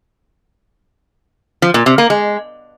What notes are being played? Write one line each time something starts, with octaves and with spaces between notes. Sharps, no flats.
F3
A#2
C3
A#3
G#3